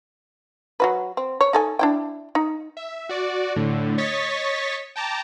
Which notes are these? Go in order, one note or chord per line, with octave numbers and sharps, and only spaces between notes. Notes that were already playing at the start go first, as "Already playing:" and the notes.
F#3 F#4 B4
C4
C#5
D#4 A4 G#5
D4 E4 G5
D#4
E5
F#4 D5
A2 D3
C#5 D#5 C#6 A6 B6
G5 A5 A#5 D6